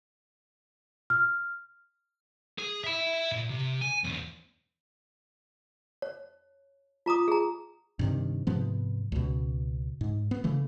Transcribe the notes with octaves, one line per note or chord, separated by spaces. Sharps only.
F6
G#4
E5 B5
A#2
C3
G#5
B1 E2
C#5
F4 A#5 D6 D#6
G#4 A#5
G2 C3 D#3
G#2 C3 F3 B3
C#2 B2
G#2
B3
C#3 E3 A3